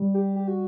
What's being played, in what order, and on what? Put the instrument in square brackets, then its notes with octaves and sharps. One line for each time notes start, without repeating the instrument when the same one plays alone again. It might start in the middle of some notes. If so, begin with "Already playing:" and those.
Already playing: [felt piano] G3
[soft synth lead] G4
G4
F#4